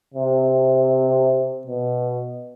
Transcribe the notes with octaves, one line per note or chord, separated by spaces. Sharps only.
C3
B2